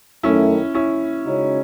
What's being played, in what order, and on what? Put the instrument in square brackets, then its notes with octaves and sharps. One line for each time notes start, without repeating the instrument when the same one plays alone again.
[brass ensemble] F#2 D#3 A3 [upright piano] C#4 E4
[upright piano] C#4 E4
[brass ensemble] C#3 G#3 D#4 F#4 C#5